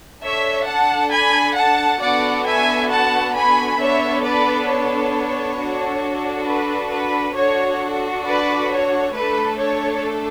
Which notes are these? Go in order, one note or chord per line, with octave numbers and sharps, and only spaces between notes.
D4 A4 C#5 E5
F#5 A5
G#5 B5
F#5 A5
B3 D4 F#4 A4 D5 F#5
E5 G#5
F#5 A5
G#5 B5
B3 D4 A4 C#5 E5
B4 D5
C#5
D4 F#4 A4
B4
B4
D4 F#4 A4 C#5
B4 D5
C#5
A3 D4 A4 B4
C#5